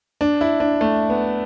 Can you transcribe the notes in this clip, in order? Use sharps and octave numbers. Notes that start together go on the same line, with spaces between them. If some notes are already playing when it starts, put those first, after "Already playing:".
D4
E4
D4
A3
B3